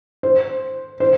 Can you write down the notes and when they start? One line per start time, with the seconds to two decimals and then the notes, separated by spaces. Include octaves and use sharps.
0.23 C5
1.00 C5